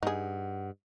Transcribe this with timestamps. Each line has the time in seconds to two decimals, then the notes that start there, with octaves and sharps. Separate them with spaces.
0.03 G2 D#4 G#4 F#5